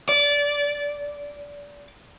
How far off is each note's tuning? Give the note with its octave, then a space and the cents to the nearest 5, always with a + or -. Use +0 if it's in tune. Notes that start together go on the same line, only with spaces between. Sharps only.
D5 -20